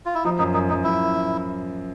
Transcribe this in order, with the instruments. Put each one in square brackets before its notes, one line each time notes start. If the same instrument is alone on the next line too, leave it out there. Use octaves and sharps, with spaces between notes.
[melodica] F4
E4
[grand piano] F3 [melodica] D#4
[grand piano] F#2 [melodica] D#4
[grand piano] F#2 [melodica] D#4
[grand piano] F#2 [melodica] D#4
[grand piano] F#2 [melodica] E4